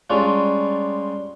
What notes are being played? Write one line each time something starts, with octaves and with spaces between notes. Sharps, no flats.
G3 G#3 C#4 D4 F4